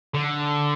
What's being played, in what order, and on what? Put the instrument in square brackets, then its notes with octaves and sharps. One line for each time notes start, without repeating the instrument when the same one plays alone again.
[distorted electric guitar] D3